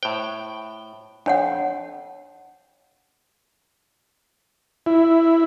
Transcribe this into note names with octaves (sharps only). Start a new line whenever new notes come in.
A2 C5 G5
F2 D4 C#5 F#5
E4